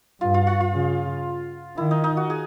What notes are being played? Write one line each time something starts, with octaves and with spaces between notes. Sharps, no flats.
G2 F4
F4
F4
F4
C#3
D#3 E4
D#4
D#4
F#4
G#4